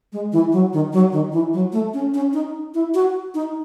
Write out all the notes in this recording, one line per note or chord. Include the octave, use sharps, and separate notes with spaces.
G#3
E3
F#3
D#3
F#3
D#3
E3
F#3
A3
C#4
C#4
D#4
E4
F#4
D#4